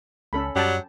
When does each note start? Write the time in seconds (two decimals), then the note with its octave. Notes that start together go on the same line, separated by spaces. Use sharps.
0.33 C#2 C#4 A4 B5
0.56 F#2 F#3 G3 G5 A5